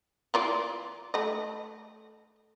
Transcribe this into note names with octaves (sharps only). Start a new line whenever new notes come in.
E3 F4 D5
A3 D#5